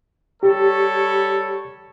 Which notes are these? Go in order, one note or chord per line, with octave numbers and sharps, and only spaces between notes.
G3 G4 A4 C#5